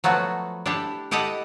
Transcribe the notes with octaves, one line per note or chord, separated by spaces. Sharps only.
F3 F#3 A3 B3 F#4
D4 E4 G4 A4
E4 G4 A4 D#5 F#5